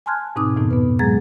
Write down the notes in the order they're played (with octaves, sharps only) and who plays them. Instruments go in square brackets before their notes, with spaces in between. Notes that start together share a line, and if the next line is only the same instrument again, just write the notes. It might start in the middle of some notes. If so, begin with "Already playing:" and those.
[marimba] G#5 A5 C6 F6 F#6 G#6
G#2 B2 C4 D#4 D6 D#6
F2 A2 D#3 B3 D#4
B3 B4
F#3 G#3 G#4 A#5 G#6 A6